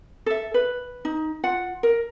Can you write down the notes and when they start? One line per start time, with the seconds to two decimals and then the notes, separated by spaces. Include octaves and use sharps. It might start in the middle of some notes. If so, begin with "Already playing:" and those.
0.26 A4 E5
0.54 B4
1.05 D#4
1.44 F4 F#5
1.83 A#4